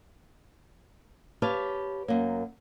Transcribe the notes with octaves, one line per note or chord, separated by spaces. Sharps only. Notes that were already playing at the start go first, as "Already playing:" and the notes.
G4 B4 C#5 F5 A5
F#2 A#3